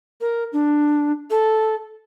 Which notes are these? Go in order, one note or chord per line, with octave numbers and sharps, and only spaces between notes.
A#4
D4
A4